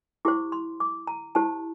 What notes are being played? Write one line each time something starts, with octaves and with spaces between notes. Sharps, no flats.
E4 G4 C5 D6
C6
D6
A#5
E4 G4 C5 A5